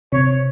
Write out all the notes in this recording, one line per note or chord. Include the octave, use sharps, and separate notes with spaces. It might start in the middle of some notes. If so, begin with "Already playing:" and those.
C3 C#5